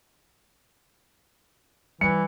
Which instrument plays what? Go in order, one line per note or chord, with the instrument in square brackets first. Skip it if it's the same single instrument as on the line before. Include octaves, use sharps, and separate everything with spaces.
[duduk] E3 [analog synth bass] G3 [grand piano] C#7